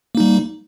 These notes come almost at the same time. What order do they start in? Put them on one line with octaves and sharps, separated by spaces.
A#3 D#4 G3